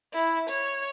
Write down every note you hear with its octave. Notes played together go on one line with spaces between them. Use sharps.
E4
C#5